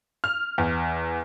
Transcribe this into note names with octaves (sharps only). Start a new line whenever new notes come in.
F6
E2